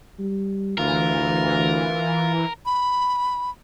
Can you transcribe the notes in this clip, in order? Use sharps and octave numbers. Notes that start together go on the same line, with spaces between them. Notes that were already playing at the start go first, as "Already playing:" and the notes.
G3
D2 E3 F4 A#4
B5